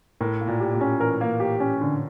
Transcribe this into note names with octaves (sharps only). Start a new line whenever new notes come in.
A2 A#4
A#3
A#2
G4
A#2
C#4
E3 A#4
A#3
G4
C#4
D3